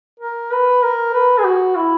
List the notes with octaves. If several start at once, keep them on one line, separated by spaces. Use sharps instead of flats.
A#4
B4
A#4
B4
G#4
F#4
E4